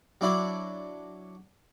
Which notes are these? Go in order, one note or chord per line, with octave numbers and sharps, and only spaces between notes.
F#3 D4 E4 F#4 D5